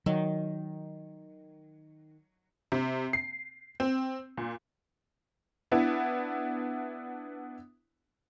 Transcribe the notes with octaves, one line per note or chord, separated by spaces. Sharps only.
D#3 F#3
C3
C7
C4
A#2
B3 D4 E4